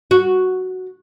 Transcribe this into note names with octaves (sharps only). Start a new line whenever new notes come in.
F#4